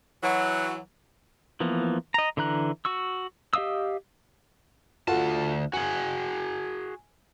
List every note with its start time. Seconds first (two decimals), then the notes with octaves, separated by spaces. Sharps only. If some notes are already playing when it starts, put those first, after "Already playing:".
0.23 E3 F#3
1.60 E3 F3 A#3 B3
2.14 D#5 A#5
2.37 D3 E3 A#5 F#6
2.85 F#4 C#6 E6
3.53 G4 D#5 F5 D#6 E6
5.08 D2 F4 F#4 A4 A5
5.73 F#4 G#4 G#5 F#7